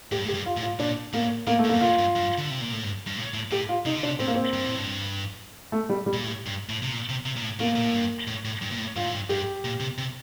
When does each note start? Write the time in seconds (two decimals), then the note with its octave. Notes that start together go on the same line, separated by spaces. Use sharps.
0.12 A2 G4
0.18 G2
0.25 A2
0.28 G4
0.34 G2
0.46 F4
0.57 A2
0.63 F4
0.79 A#2 D4
1.13 A2 A#3
1.47 A2 A#3
1.59 A3
1.64 A2
1.69 A#3
1.74 G2
1.81 A2 F4
1.99 G2
2.15 G2
2.38 D3
2.50 C3
2.61 A#2
2.72 A2
2.84 G2
3.07 G2
3.17 A2
3.34 A2
3.51 A2 G4
3.69 F4
3.85 C3 D#4
3.96 D3
4.03 C3 D4
4.19 A2 C4
4.27 A#3
4.35 C4
4.53 G2
4.65 A2
4.78 G2
5.72 A3
5.89 G3
6.06 G3
6.13 A#2
6.24 A2
6.46 G2
6.69 A2
6.83 C3
6.92 A#2
7.09 C3
7.26 C3
7.36 A#2
7.43 A2
7.59 A2 A#3
7.76 A#2
7.85 A2
7.93 G2
8.27 A2
8.45 A2
8.62 G2
8.71 A#2
8.79 A2
8.96 G2 F4
9.04 A2
9.13 G2
9.29 G2 G4
9.64 A#2
9.80 C3
9.98 C3